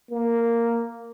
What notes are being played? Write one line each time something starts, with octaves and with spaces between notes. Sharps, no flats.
A#3